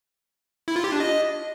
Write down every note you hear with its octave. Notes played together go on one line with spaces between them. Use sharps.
E4
F4
G4
D4
D#5